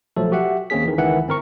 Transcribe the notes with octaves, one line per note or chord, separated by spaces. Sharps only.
B1 F3 F#3 A3 A4
F#4 G4 E5 F#5
D#2 A#3 C4 C#4 G#4 B6
D#3 E3
C#2 D#3 E3 E5 F#5
G1 C4 A#4 C#6